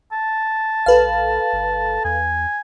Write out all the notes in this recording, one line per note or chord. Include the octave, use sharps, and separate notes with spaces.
A5
A#1 A4 B4 F5
G1
E2 G#5